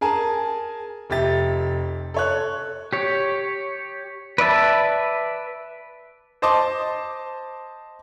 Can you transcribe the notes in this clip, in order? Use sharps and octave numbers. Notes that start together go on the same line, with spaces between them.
G#4 A#4 G#5 A5
F1 G4 E5 A6
A4 C#5 F#6
G4 C#5
B4 D5 E5 A5
C5 D#5 A5 C6 D6